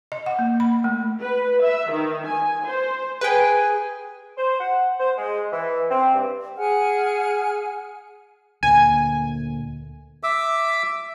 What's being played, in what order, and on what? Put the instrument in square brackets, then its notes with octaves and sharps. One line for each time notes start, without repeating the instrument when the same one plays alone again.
[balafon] D#5
F#5
A#3
B5
A3
[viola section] B4
E5
D#3
G#5
C5
[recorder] G#4 [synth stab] B4 G5
[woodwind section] C5
F#5
C5
G#3
E3
C4
G2
[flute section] G#4 F#5 G#5 F6
[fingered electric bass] D2 A#2 [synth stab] G#5
[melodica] E5 D6 E6